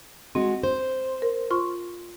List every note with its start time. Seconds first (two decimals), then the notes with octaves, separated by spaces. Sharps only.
0.35 G#3 C4 F#4
0.63 C5
1.22 A#4
1.51 F4 C6 C#6